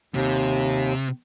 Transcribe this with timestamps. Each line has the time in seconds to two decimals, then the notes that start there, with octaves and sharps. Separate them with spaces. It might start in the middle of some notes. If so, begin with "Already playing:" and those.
0.14 D#2 C3